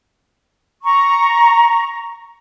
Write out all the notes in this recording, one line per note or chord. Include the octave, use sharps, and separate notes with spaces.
A#5 C#6